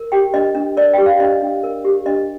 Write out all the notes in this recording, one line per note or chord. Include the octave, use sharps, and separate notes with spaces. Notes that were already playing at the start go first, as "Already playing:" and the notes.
Already playing: A#4
G4 G5
D4 D#5
D4
A#4 D5
G4 G5
F5
D4 D#5
D4
A#4
G4
D4 D#5